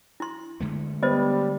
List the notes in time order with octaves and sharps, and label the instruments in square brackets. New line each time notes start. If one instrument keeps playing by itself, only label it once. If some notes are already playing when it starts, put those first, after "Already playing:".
[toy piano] E4 C6
[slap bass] D3 G#3 A3
[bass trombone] G3 [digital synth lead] B3 [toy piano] C5 D#5